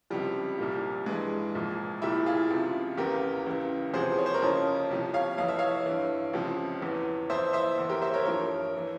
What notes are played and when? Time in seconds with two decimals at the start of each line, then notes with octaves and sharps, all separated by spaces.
0.10 C#2 C3 F3 G3
0.58 C2 A#2 F3
1.06 G2 E3 G#3
1.55 C2 A#2 F3
2.02 C2 A#2 F3 E4 G4
2.26 F4 G#4
2.50 C#2 C3 F3
2.98 E2 C#3 E3 G4 A#4
3.47 C#2 C#3 E3
3.94 E2 C3 F3 G#4 C5
4.18 C#5
4.26 C5
4.34 A#4 C#5
4.42 F2 C#3 F3
4.90 C2 C3 F3
5.14 C#5 F5
5.38 F2 E3 F5
5.48 E5
5.59 C#5 F5
5.86 G2 E3
6.34 C#2 C3 F3
6.81 E2 E3
7.30 F2 E3 C5 E5
7.53 C5 E5
7.78 E2 E3
7.89 G4 A#4
8.02 C5 E5
8.14 A#4 C#5
8.25 G2 F3 A#4 C#5
8.77 E3